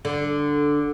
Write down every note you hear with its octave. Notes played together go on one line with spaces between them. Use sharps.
D3